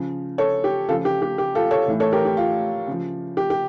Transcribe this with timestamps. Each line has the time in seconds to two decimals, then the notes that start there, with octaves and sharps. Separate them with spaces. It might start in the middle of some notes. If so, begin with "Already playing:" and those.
Already playing: C#3 F3
0.38 A4 C#5
0.64 G4
0.89 C#3 F3 F4 A4
1.05 G4
1.22 G4
1.38 G4
1.55 F4 A4
1.71 A4 C#5
1.88 A2 E3
2.00 A4 C#5
2.13 G4 A#4
2.25 G4
2.37 F4
2.87 C#3 F3
3.37 G4
3.50 G4